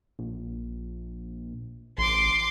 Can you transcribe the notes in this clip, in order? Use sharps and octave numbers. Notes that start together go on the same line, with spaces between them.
A#1
A1 C6 D6